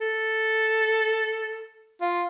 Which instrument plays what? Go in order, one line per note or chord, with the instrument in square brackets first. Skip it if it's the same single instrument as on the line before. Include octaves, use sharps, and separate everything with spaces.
[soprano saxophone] A4
F4